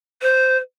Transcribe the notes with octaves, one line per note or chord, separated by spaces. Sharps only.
C5